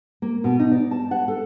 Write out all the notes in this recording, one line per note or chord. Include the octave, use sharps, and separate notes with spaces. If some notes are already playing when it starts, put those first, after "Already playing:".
A#3
B2
D#4
D5
A5
F#5
A4